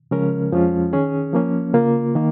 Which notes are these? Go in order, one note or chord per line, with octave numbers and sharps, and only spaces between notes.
C#3 F3 G#3 C#4 A#4
F2 F3 G#3 C#4 F4
D#3 C#4 G#4
F3 A#3 C#4
C#3 A#3 F4
D#3 A#3